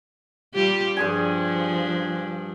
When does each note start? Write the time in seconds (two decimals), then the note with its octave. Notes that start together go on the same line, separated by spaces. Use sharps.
0.55 G3 F4 G4
0.97 G2 F3 D4 G#4 G#5